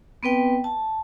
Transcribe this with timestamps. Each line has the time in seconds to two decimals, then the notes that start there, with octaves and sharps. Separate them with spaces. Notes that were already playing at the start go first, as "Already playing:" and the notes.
0.23 B3 C4 B4 G5
0.64 A5